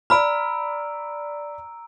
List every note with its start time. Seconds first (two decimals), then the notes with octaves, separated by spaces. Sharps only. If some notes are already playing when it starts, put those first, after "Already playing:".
0.10 D5 A#5 B5 E6 F6 D7